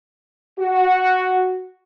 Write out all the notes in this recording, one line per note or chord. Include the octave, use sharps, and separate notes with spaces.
F#4